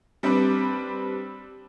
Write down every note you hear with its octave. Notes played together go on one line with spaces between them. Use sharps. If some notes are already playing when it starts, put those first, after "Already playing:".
G3 C4 D4 B4